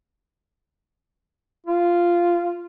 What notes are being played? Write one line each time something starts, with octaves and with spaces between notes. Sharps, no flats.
F4